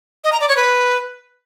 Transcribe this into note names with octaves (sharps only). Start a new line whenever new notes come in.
D#5
A#5
D5
C#5
B4